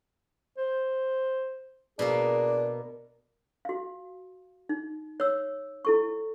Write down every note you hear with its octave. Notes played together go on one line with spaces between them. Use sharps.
C5
B2 A#3 D4 G#4
F#4 F5
D#4
C#5 E6
E4 A4 C#6